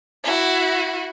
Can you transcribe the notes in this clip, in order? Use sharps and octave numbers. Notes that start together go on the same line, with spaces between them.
E4 F#4